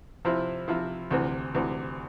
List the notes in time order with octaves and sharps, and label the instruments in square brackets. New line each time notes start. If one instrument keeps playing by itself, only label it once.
[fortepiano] C3 F3 C4 E4
C3 F3 C4 E4
D2 C3 E3
D2 C3 E3